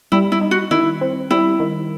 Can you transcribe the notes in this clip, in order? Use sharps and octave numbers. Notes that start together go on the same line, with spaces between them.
G3 E4
E4
D#4
F#4
D#3 E4
C4
G3 E4
D#3